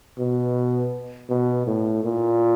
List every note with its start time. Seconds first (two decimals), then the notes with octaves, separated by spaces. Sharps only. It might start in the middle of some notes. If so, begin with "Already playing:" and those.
0.18 B2
1.30 B2
1.67 A2
2.04 A#2